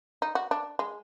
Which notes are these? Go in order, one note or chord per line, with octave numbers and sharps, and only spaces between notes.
D#4
F#4
D4
G#3